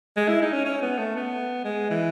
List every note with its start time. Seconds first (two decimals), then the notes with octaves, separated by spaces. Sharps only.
0.17 G#3
0.28 E4
0.42 D#4
0.53 C#4
0.65 C#4
0.82 B3
0.98 A3
1.16 B3
1.64 G#3
1.90 E3